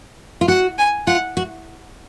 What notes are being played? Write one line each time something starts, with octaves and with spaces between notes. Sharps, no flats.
F4
F#4 F#5
G#5
F4 F#5
F#4